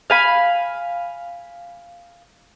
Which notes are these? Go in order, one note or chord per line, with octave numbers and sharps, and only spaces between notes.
F5 G#5 B5